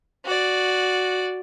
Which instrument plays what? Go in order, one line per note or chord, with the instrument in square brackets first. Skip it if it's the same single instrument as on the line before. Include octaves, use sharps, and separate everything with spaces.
[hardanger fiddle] F#4 D5